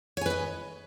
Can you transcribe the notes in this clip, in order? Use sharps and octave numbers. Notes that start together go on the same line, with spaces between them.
B4 C#5 D#5 G#5